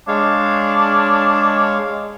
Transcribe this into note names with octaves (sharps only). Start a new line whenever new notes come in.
G#3 D4 C#5 F5